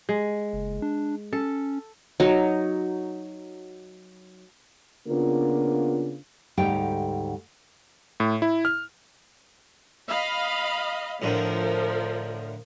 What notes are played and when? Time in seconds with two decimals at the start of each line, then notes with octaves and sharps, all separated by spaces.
0.09 G#3
0.53 F#1
0.82 D4
1.33 C#4 A4
2.20 F#3 D#4
5.08 C#3 A#3 B3 D4 F4
6.57 D2 G#2 G3 D#4 G4 G5
8.20 A2
8.42 E4
8.65 F6
10.10 D#5 F5 B5
11.22 A2 D3 F3 A#4